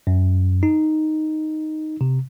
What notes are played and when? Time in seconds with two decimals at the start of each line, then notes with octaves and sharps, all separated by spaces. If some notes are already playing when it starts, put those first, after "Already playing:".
0.07 F#2
0.63 D#4
2.01 C3